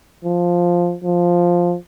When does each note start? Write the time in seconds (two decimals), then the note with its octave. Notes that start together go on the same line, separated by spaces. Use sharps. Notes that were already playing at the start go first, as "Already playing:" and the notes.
0.25 F3
1.04 F3